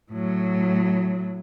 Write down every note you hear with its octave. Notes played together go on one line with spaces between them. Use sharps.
A2 F#3